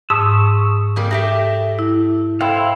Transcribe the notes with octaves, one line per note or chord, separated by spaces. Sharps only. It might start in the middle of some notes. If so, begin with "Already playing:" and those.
G#2 A5 C#6 D#6 E6
F2 G3 A#3
A3 G4 E5 A#6
E4
E4 A4 C5 F5 G5